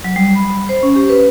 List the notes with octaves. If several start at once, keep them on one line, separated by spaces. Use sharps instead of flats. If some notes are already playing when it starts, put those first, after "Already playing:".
F#3
G3
B5
C5
C#4
G4
B4